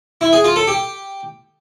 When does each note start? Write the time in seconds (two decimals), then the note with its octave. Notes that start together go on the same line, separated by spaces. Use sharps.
0.21 E4
0.33 G#4
0.44 F4
0.56 A4
0.68 G4